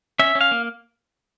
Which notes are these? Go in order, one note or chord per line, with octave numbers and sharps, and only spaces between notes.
C#4 E5
C#4
F5
A#3